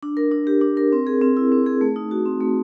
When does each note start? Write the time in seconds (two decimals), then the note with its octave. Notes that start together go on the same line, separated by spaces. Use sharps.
0.03 D4
0.17 A#4
0.32 D4
0.47 G4
0.61 D4
0.77 A#4
0.92 C4
1.07 G#4
1.21 C4
1.37 E4
1.52 C4
1.66 G#4
1.81 A3
1.96 D#4
2.11 F#4
2.26 C4
2.41 A3